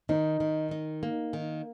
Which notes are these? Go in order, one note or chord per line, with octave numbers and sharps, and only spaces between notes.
D#3 D#4
D#3
D#4
A#3
D#3